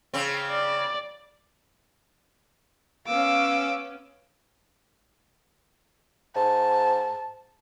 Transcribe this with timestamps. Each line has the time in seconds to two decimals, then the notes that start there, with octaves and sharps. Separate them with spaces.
0.14 C#3 C4
0.50 D5
3.06 B3 C#4 F5 D6 E6
6.36 G#2 A5